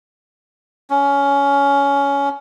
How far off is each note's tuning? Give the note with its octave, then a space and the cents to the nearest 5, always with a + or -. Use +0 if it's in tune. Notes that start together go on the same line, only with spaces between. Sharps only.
C#4 +15